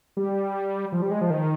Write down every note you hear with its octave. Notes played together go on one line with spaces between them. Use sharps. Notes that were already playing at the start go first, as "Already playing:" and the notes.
G3
F3
G3
G#3
F3
D#3